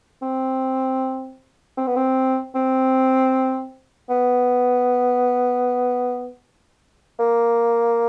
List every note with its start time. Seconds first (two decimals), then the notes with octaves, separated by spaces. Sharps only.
0.22 C4
1.77 C4
1.87 B3
1.96 C4
2.55 C4
4.10 B3
7.19 A#3